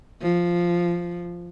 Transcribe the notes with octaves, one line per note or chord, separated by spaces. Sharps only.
F3